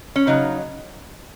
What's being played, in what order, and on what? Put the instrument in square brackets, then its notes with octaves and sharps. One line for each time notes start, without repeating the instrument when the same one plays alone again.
[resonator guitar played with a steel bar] C#4
C#3 F#3 D#4